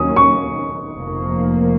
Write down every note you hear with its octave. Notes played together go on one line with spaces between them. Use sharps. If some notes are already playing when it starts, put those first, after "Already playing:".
Already playing: D#2 D#3 F#3 A#3 C#4 D#6
C#6
F1 F2 F3 A#3